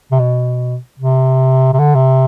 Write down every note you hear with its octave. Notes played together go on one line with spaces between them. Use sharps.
C3
B2
C3
C3
D3
C3